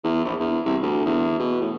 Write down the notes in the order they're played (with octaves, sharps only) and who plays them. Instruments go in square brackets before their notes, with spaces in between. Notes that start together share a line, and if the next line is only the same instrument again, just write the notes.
[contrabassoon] E2
A#1
E2
C2
D2
E2
B2
A2